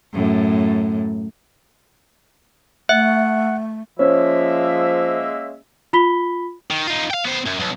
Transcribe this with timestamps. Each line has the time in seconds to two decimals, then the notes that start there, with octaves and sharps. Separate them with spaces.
0.13 F#2 A2
2.89 A3 E5 F#5
3.99 F3 G#3 A#3 C#4 C5 E5
5.93 F4 B5 B6 G7
6.70 D#3
6.87 D#4 F4
7.11 F5 G5
7.25 B3 C5
7.47 F#2
7.60 B1